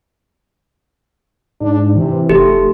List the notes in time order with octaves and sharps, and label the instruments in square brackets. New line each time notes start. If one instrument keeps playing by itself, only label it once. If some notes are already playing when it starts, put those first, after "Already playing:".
[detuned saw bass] G#2 [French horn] D4
[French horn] C3 [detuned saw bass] E3
[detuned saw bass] F1 [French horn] A3 [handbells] G4